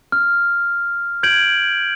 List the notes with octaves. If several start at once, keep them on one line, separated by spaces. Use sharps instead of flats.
F6
G6 G#6 D7 F#7